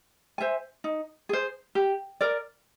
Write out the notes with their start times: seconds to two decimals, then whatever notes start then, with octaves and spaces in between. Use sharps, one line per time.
0.38 C5 E5 G#5
0.84 D#4
1.29 G#4 C5
1.75 G4
2.21 A#4 D5